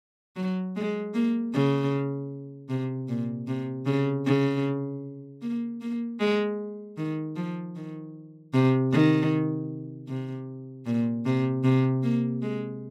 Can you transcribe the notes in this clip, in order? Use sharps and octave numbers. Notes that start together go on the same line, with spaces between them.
F#3
G#3
A#3
C#3
C3
A#2
C3
C#3
C#3
A#3
A#3
G#3
D#3
F3
D#3
C3
D#3
C3
A#2
C3
C3
A#3
G#3